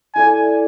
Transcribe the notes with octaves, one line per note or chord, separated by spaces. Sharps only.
E4 A4 D5 G#5